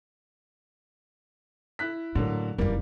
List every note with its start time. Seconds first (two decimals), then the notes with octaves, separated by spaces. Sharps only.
1.79 E4 F#6 B6
2.15 A2 D3 F#3 A#3
2.58 F1 F#2 E3 G3 A#3